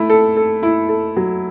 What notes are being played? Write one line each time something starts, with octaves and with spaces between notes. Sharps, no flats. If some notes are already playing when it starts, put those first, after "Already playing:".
Already playing: A3 E4
A4
A4
E4
A4
F#3